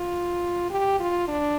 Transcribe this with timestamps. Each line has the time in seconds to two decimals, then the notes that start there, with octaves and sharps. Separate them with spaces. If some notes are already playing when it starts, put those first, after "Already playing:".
Already playing: F4
0.70 G4
1.00 F4
1.28 D4